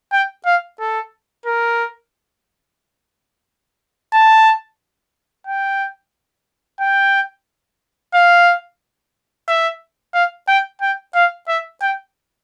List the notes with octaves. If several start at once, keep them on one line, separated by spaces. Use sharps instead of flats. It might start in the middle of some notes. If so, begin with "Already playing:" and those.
G5
F5
A4
A#4
A5
G5
G5
F5
E5
F5
G5
G5
F5
E5
G5